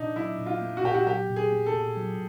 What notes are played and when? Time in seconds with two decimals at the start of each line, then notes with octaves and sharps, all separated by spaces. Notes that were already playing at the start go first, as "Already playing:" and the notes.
Already playing: A#2 D4 D#4
0.16 F#3 E4
0.39 A#2
0.46 F4
0.61 A#3
0.77 F#4
0.84 A#2 G4
0.94 F#4
1.06 F#3 G4
1.29 A#2
1.36 G#4
1.51 A#3
1.66 A4
1.74 A#2
1.97 F#3